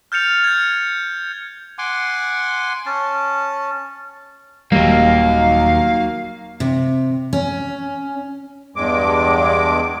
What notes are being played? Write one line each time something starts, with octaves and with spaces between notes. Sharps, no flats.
F6 G6 A6 C#7 F7
G6 G#6
F#5 G#5 C6 D6
C#4 A5
D#1 D#2 D#3 F#3 G3 A#3 F5
C3
C#4
E2 G2 G#3 D6